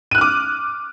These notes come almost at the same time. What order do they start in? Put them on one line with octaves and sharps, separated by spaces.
D#7 F#6 F6 D6